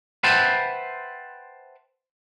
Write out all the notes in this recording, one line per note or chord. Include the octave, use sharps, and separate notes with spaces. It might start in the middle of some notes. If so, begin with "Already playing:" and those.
B4 C5 E5 F#5 G5 A5